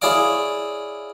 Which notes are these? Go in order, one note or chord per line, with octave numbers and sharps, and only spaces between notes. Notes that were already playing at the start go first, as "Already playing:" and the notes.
E4 G#4 C#5 D5 F5 D6